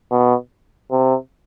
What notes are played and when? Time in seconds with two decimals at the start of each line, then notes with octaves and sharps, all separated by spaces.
0.11 B2
0.91 C3